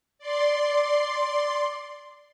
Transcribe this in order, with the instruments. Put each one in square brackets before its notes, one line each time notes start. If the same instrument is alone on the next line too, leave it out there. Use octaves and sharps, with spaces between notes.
[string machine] D5 C6